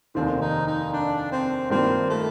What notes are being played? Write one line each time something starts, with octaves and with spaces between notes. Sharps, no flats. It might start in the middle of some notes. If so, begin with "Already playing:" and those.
F1 D#2 D#3 C4
D#4
D#4
D4
C4
G2 D#3 A#3 C4 F4
A3